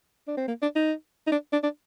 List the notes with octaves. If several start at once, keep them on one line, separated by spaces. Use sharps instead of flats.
D4
C4
A#3
D4
D#4
D#4
D4
D4
D4